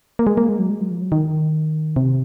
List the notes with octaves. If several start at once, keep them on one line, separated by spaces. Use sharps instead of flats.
A#3
G#3
A#3
G#3
F#3
G#3
F#3
F3
F#3
D#3
C3